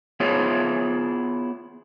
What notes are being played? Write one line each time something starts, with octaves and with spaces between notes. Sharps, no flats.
B3 E4 F4 G#4 C#5 E5